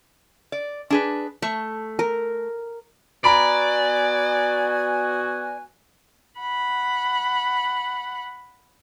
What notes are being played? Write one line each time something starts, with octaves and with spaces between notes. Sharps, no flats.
D5
D4 G#4 B4
A3 C#6
A#4
B3 F#4 D5 G#5 A#5 B5 D7
F#5 B5